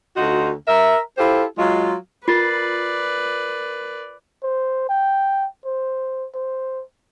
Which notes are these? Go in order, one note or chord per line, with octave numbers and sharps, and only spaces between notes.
D2 D#4 F4 F#4
A#4 E5
E4 F4 G4 A4 C5
F#3 G#3 F4
F4 A#4 B4 D5 A6 C7
C5
G5
C5
C5